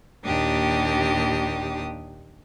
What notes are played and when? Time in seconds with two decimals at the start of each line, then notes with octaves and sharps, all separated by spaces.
0.24 D#2 A#2 D4 G4 D#6